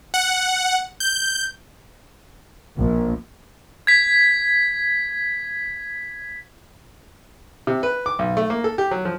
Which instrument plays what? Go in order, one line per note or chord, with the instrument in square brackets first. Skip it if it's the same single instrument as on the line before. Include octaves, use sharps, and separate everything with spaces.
[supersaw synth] F#5
G6
[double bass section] A#1
[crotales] G#6 B6
[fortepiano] C3
B4
D6
B1
A3
A#3
A4
G4
F#3
F3